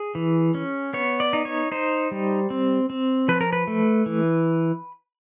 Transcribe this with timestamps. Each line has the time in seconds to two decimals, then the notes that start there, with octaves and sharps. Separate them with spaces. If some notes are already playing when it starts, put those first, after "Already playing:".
Already playing: G#4
0.15 E3
0.55 C#4
0.93 B3 C#5
1.20 D5
1.33 D#4
1.45 C#5
1.72 D#4 C5
2.11 G3
2.50 C4
2.90 C4
3.28 F3 B4
3.41 A#4
3.53 B4
3.67 A3
4.06 E3